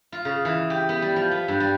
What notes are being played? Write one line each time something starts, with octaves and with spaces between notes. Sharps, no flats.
F4
C#3
E3
G4
B3
G3
F3
B3
G2
G3